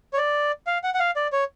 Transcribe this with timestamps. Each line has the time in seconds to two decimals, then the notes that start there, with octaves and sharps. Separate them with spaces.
0.13 C#5
0.17 D5
0.67 F5
0.84 F#5
0.94 F#5
0.99 F5
1.16 D5
1.33 C#5